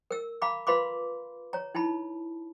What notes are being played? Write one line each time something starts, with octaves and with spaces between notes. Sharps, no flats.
A#4 E6
F5 A#5 B5 D6
F4 B4 F5 B5 C6 D6
C#5 A#5
D#4 E4 A5 B5